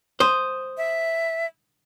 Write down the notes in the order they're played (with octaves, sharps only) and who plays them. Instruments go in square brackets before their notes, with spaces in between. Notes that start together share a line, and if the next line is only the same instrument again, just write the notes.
[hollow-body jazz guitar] C5 [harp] D#6
[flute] E5